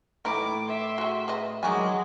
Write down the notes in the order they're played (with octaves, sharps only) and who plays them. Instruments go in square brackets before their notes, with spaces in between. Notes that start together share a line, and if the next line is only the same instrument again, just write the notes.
[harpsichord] A2 [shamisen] E3 D#4 E4 [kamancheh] D6
[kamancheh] E5 C6
[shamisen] F#4 G#4
G#4 B4 D#5
[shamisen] D#3 F#4 G#5 [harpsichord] F#3 D6 [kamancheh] G#3